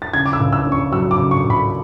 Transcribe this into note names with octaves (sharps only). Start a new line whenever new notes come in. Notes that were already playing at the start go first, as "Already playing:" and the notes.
A6
C#3 G#6
D6
E6
C#2
E6
C#4
C#6
F#3 E6
D6
C#3
C#6
C#2
B5